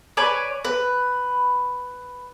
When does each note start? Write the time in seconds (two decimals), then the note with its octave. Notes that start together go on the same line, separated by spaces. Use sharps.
0.17 B4 C#5 D5 G#5
0.65 B4